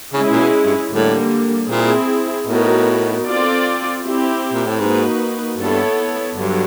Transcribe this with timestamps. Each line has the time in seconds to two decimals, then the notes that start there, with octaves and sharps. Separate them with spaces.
0.14 C#3 G#3 C#4 E4 G#4
0.32 A#2
0.40 B2
0.66 G2
0.91 A2 D3 G3 A#3
1.69 A#2 C4 E4 G#4
2.47 A2 B3 D#4 F#4 A#4
3.24 C4 F4 A4 D5
4.02 C4 E4 G4
4.53 A#2
4.66 A2
4.80 G#2 A#3 D#4 F#4 B4
5.57 G2 B3 E4 A4 C#5
6.35 G2 D3 F#3